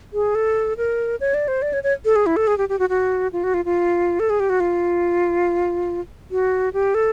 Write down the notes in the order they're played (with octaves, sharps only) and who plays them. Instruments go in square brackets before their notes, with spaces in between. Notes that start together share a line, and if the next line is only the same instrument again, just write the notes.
[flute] G#4
A4
A#4
C#5
D5
C5
D5
C#5
C#5
A4
G#4
E4
A4
G#4
G4
G4
F#4
F#4
F4
F#4
F4
F4
A4
G#4
G4
F#4
F4
F#4
G4
A4